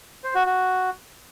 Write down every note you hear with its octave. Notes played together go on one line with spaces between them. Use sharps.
C5
F#4
F#4